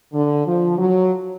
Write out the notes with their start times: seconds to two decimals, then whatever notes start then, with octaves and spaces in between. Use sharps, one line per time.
0.13 D3
0.46 F3
0.78 F#3